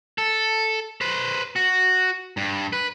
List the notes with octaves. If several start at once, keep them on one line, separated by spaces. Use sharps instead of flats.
A4
B4 C5
F#4
G2
B4